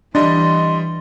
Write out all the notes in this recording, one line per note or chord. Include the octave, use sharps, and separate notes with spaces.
E3 G3 D4 D#5 C6 A6